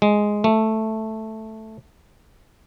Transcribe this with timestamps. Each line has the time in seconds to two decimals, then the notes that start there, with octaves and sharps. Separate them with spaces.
0.02 G#3
0.44 A3